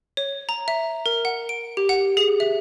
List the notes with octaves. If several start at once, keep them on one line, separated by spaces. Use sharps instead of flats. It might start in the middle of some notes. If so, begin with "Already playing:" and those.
C#5
A#5
E5
A#4
F#5
D7
G4
F#5
G#4
E5